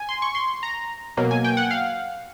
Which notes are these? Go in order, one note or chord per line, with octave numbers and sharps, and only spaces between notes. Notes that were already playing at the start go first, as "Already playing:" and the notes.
Already playing: G#5
C6
C#6
C6
A#5
B2 F#3 A#3
G#5
G5
F#5
F5